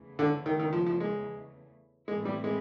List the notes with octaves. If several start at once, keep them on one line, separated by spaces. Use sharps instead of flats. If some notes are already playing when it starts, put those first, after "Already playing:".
Already playing: E2 C#3 E3 A3
D3
D#3
D#3
F3
F3
G#3
A2 E3 G#3 A3 C4 E4
G3
G#3